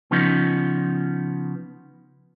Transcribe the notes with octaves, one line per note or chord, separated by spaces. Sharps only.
C#3 F3 B3 C#4 D#4